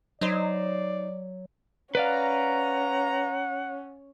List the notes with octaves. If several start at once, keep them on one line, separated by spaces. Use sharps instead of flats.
F#3 D#4 C5 D5
C#4 B4 D5 F5 F#5 A#5